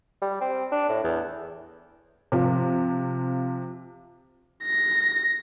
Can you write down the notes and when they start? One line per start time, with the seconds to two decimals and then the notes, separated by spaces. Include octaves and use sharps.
0.22 G3
0.41 C4
0.72 D4
0.89 A2
1.04 E2
2.32 C3 F3
4.65 A#6